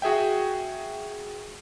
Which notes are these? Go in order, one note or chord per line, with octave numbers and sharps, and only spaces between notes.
F#4 G#4 E5 G5